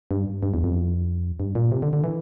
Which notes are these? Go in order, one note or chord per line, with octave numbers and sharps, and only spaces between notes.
G2
G2
E2
F2
G2
A#2
C3
D3
D3
E3